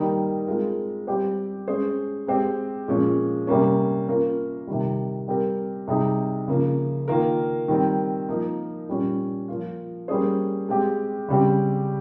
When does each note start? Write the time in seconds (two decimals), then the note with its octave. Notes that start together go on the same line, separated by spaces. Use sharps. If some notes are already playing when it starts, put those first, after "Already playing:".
Already playing: D#3 G3 A#3 D#4 A#4
0.47 G#3 C4 F4 A#4
1.07 G3 C4 G4 C5
1.68 G#3 C#4 G#4 C5
2.27 G#3 C4 G4 C5
2.88 A#2 F3 G#3 C#4
3.47 C3 G3 A#3 C#4
4.08 A#3 C#4 F4 A#4
4.67 C3 D#3 G3
5.28 G3 C4 G4 A#4
5.88 C3 G3 C4 D#4 G#4
6.48 C#3 F3 A#3
7.08 D#3 A#3 F4 A#4
7.68 D#3 G3 C4
8.29 F3 A#3 D#4 A#4
8.89 A#2 G3 C#4
9.48 F3 A#3 F4
10.08 G3 A#3 C#4 G#4 C5
10.69 G#3 C4 G4
11.29 C#3 G3 C4 G4